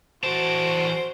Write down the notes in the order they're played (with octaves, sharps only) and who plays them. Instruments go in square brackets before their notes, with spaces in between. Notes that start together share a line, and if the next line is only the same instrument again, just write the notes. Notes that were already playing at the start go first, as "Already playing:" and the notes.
[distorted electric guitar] E2 A5 [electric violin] F#4 D7 [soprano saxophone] C5